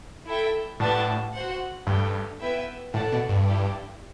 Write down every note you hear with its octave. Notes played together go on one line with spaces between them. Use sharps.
E4 A4 E5 G5
A2 D4 G4 B4 F#5 A5
F#4 C5 F#5
G2 A3 D4 G4
B3 E4 B4 E5 G5
A2 D4 A4 D5 F#5 A5
B2
G2
E4 G4 D5